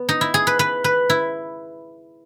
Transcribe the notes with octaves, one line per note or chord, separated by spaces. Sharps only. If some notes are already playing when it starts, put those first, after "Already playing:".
Already playing: B3
D#4
E4
G#4
B4
B4
B4
E4